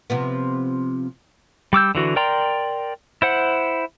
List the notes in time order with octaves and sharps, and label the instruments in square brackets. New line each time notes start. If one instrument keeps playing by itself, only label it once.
[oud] C3 F3 B3
[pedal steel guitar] G3 D6 E6 G6
D3 E3 F#4
A#4 D5 G5 A#5 C6
E4 C5 F#5